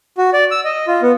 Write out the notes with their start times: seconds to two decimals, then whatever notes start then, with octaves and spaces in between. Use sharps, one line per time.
0.18 F#4
0.33 D5
0.51 E6
0.65 D#5
0.87 F4
1.02 B3